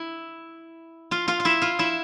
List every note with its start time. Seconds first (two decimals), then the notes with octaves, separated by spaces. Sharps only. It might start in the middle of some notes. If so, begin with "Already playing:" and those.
Already playing: E4
1.11 F4 F5
1.28 F4 F5
1.40 F5
1.45 E4 E5
1.62 F4 F5
1.79 E4 E5